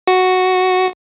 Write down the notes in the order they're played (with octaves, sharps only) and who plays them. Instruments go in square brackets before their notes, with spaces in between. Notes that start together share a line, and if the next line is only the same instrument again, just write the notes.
[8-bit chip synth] F#4